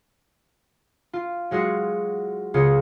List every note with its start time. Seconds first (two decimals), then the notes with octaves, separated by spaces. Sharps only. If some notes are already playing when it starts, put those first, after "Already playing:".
1.13 F4
1.51 F#3 G#3 F4 F#4
2.54 C#2 C#3 F4 G#4 C#7